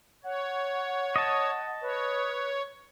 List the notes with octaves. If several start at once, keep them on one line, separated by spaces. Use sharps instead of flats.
C#5 F#5
D#5 A5
B4 C#5